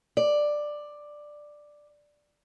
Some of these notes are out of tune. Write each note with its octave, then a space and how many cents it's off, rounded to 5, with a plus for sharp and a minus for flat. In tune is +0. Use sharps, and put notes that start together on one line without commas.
D5 +10